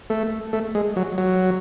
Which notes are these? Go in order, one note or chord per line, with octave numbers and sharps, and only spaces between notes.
A3
A3
G#3
F#3
F#3